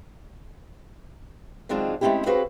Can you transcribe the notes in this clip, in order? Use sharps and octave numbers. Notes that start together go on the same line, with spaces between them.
D#3 F#3 G#3 C4 D4 F4
G#3 A3 C4 C#4 E4 G4
C4 F#4 G#4 B4 F5